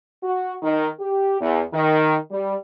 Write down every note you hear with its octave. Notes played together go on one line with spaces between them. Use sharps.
F#4
D#3
G4
E2
D#3
G3